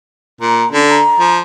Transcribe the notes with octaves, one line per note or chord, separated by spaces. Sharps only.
A#2 A#5
D3 C#4
A#5
F3